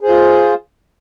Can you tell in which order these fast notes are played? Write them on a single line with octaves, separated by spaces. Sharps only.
G#4 C5 F4